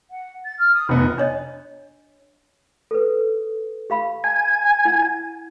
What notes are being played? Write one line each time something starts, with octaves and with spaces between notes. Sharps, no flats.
F#5
A6
F6
D#6
F1 B3 D#4
D4 C#5 D#5
A4 B4
G4 F5 B5
G#5 A5
E4 F#5